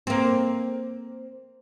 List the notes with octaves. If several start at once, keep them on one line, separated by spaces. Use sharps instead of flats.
A#3 C4